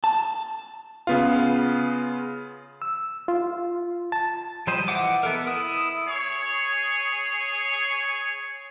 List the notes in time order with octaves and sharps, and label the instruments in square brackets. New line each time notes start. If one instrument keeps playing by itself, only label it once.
[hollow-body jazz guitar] A5
[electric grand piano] C#3 B3 F4
[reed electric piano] E6
F4
A5
[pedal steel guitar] F3 G3 G4 C5 D#5
E3 D#5 E5 F#5 D6
B3 A4 A#4
E4 D#6
[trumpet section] G#4 C#5